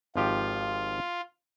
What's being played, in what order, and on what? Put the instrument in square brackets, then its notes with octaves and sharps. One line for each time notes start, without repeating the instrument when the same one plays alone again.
[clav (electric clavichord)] G#1 F3 G4 [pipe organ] F4